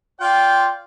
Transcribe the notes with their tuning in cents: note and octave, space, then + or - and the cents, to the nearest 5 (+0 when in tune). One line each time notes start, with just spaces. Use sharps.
F4 +0 D5 -25 G5 +0